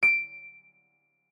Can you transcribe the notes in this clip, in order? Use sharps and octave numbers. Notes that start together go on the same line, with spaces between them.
D7